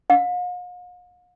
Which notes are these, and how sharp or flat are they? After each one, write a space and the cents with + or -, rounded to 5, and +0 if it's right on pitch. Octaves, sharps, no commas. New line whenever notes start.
F5 +45